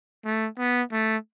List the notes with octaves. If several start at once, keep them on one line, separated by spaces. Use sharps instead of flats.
A3
B3
A3